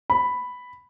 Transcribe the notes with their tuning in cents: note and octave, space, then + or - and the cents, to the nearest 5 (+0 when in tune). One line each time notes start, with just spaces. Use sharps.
B5 +5